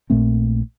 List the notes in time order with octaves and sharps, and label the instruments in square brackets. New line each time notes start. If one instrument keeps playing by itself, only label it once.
[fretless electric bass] A#1 A#2 A3 C4